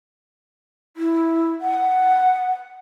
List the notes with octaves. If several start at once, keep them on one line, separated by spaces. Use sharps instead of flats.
E4
F#5